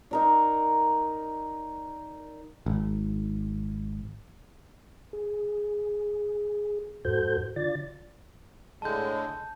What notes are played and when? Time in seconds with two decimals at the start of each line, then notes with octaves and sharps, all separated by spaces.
0.11 D#4 A#4 D5
2.66 G#1
5.13 G#4
7.05 F2 G#2 F#4 A4 C5 G6
7.56 D3 F4 D5 A6
8.82 A2 D3 G#3 A5 G6